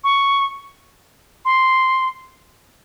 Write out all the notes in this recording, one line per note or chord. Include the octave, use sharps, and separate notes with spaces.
C#6
C6